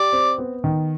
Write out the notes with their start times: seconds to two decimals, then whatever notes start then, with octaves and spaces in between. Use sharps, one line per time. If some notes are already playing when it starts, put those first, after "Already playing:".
Already playing: G4 D5
0.13 C4
0.38 B3
0.64 D#3